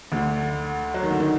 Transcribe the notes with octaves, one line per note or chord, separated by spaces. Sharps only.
D2 D3
F#3
D#3
D3
D#3